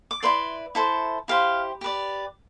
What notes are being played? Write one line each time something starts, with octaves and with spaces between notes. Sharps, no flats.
D6
E4 B4 D5 C6
E4 A4 C5
E4 G4 C5 F5
G4 B4 D5